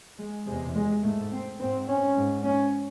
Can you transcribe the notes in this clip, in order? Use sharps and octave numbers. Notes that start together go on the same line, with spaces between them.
G#3
E2 C3 G#3
G#3
G#2 A3
C4
G#2 C4
C#4
G#2
C#4